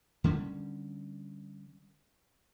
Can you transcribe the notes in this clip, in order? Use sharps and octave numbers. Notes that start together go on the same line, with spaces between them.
D3 G3 C#4